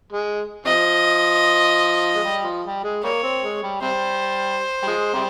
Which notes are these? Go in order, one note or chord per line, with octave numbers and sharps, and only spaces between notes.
G#3
C3 F3 D#5
G#3
G3
F3
G3
G#3
G3 A#3 C#5
C4
G#3
G3
C3 G3 C5
G3
F3 G#3
C3 G3